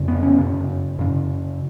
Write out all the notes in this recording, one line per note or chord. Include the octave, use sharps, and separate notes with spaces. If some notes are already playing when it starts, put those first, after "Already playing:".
Already playing: F2 C#3
B3
C#4
F#2 C#3
F#2 C#3